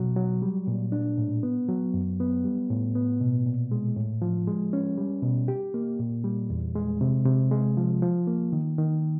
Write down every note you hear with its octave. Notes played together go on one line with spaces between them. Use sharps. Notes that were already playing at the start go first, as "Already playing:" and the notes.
Already playing: B2 F#3
F#3
G3
A#2
D4
A2
B3
F#3
F#2
B3
G3
A2
B3
B2
A#2
G#3
A2
F3
G#3
C#4
G3
B2
G4
A#3
A#2
G3
E2
G#3
C3
C3
G#3
F3
F3
A#3
D#3
D#3